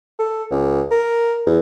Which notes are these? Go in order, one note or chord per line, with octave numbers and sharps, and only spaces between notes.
A4
C#2
A#4
E2